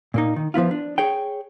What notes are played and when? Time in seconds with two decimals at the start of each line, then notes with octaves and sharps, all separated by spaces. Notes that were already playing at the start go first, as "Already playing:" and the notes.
0.14 A#2 A#3 D#4
0.36 D#3
0.54 F3 B3 E4 F4
0.71 D4
0.98 G#4 C#5 G5